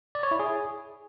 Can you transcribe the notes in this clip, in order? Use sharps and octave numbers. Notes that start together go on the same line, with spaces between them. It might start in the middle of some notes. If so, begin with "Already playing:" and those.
D5
C#5
E4
G#4